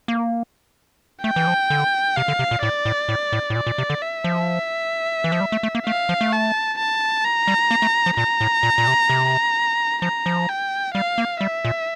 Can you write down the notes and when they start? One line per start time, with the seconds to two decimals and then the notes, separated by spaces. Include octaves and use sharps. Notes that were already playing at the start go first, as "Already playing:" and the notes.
0.08 A#3
1.24 A3 G5
1.36 E3
1.47 F3
1.70 D3
2.16 C3 F5
2.28 D3
2.39 C3
2.51 A#2
2.63 A2 D5
2.85 A2
3.09 A2
3.32 A2
3.50 A2
3.56 A#2 D5
3.67 A#2
3.78 C3
3.90 D3
4.02 E5
4.24 F3
5.24 E3
5.32 F3
5.41 G3
5.52 A3
5.63 A3
5.75 A#3
5.86 A3 F5
6.09 F3
6.21 A3
6.32 A5
6.79 A5
7.24 A#5
7.47 G3
7.71 A#3
7.82 A3
8.06 F3
8.17 A#2 A#5
8.41 A2
8.63 A#2
8.78 A#2
8.87 C3
9.10 C3
10.02 F3 A#5
10.26 F3
10.49 G5
10.94 G3 F5
11.18 A#3
11.41 G3 E5
11.65 A#2